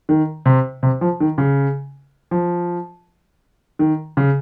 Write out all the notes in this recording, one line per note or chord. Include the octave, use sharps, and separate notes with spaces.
D#3
C3
C3
F3
D#3
C#3
F3
D#3
C#3